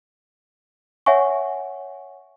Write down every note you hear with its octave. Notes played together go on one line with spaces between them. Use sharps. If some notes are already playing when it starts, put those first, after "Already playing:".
C#5 E5 F#5 G#5 C#6